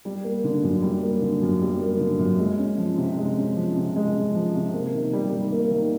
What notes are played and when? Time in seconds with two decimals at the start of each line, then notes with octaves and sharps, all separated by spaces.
0.05 G3
0.24 A#3
0.44 D3
0.64 F#2
0.82 G3
1.03 A#3
1.21 D3
1.42 F#2
1.62 G3
1.81 A#3
2.00 D3
2.19 F#2
2.39 G#3
2.58 C#4
2.78 F3
2.97 C3
3.17 G#3
3.38 C#4
3.56 F3
3.76 C3
3.96 G#3
4.15 C#4
4.35 F3
4.55 C3
4.74 A#3
4.93 D#3
5.13 G3
5.32 D#3
5.52 A#3
5.71 D#3